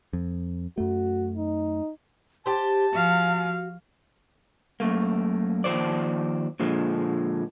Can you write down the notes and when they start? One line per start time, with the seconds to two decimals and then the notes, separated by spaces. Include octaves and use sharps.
0.13 F2
0.78 F#2 A3 F#4
1.37 D#4
2.46 G4 C5 A5
2.93 F3 F#4 F5
4.80 F#2 A3 A#3
5.64 D#2 E3 F3 C5 D5
6.60 A#2 D3 F3 G#3